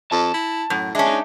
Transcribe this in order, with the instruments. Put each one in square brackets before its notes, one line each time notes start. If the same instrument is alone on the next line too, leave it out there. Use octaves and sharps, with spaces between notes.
[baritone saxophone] F2 [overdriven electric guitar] A5
[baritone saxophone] E4
[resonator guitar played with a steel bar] F#2 [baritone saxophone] A2
[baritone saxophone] G#3 [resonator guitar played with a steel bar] C#4 D4 [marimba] E5 A5
[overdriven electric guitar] D#4